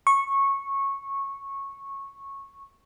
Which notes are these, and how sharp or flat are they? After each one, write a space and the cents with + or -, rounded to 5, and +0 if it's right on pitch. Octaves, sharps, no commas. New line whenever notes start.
C#6 -15